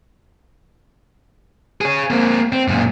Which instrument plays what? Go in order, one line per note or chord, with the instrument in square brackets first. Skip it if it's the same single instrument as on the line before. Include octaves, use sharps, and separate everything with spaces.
[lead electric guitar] G#4 C#5
A#3 C4
C4
F#2 A#2